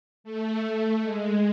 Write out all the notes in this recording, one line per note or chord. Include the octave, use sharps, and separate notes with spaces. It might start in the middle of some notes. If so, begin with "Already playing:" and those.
A3
A3
G#3